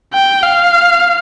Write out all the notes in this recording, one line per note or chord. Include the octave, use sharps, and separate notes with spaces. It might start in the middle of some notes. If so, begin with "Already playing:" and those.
G5
F5